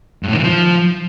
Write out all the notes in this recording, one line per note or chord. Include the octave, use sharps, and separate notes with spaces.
G2
A2
D#3
E3
F3